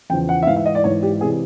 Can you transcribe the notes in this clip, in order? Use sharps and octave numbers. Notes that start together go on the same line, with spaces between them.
E2 C#3 F3 G5
F#5
E5
G#2 E3 F5
E5
D#5
D5
G#2 E3 C#5
G4
C3 E3 G#4